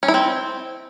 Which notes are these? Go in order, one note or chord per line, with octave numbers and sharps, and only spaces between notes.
C#4
E4
C4